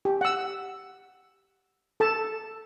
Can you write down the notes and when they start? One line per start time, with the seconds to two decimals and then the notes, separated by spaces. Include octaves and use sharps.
0.05 G4
0.21 F#5 E6
2.00 A4 A5